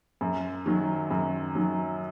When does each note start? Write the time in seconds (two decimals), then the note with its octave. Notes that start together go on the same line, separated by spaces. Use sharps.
0.21 F#2
0.66 D#3 F#3
1.10 F#2
1.55 D#3 F#3